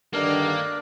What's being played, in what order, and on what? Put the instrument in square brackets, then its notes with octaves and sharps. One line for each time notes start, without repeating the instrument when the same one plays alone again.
[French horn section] G2 D3 D#3 [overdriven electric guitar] A#3 [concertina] D4 A#4